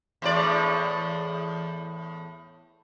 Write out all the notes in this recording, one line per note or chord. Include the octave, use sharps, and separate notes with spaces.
E2 A2 D5